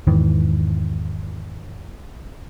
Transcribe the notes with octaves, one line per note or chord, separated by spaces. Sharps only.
E2 G#2 D#3 E3